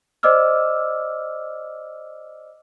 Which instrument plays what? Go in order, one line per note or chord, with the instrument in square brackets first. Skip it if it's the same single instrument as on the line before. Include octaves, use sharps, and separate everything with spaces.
[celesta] C5 D5 D#5 D6 E6 F6